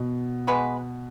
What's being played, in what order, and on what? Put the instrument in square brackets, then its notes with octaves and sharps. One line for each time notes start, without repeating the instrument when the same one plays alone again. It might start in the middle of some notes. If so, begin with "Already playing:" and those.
Already playing: [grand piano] B2
[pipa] G#3 B3 F#4 B4